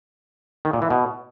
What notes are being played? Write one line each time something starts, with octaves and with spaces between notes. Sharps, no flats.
D#3
A#2
E3
B2